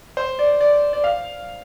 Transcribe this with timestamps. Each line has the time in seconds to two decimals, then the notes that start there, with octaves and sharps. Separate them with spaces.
0.17 C5
0.39 D5
0.61 D5
0.93 D5
1.04 F5